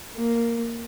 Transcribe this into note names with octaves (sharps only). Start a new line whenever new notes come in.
A#3